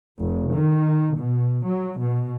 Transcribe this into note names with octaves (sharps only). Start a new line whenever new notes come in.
F1
D#3
B2
F#3
B2